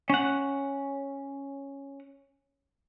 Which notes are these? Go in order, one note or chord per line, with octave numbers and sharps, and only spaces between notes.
C#4 F#5